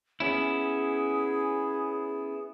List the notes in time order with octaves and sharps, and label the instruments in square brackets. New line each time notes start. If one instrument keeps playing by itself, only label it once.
[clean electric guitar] B3 C#4 E4 [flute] G#4